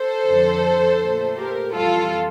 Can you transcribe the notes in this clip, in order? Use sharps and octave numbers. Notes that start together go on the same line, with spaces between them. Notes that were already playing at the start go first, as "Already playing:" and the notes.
Already playing: A4 C5
F2 D3 F3
A#2 A3
G4 A#4
F2 E3 G3 F4 A4